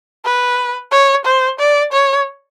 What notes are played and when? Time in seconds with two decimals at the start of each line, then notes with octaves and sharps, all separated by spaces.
0.25 B4
0.91 C#5
1.25 C5
1.59 D5
1.93 C#5